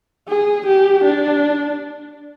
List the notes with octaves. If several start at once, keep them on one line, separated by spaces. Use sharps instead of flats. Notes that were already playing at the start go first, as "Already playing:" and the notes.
G#4
G4
D4